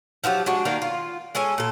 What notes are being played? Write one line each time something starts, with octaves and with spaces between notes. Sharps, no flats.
F3 F#3 F4 G4
G#3 D4 F#4
D#3 A#3 D4 A#4
F4
G#3 C#4 A4 G#5
A#2 A4